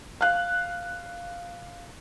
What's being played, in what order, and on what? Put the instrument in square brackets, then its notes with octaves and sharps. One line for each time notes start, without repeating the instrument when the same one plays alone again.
[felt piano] F5 F#6